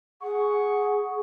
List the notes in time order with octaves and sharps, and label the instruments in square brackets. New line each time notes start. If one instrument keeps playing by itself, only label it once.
[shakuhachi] G#4 [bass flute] F#5 [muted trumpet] C#6